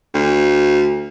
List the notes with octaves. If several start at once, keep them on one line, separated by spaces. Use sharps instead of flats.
D2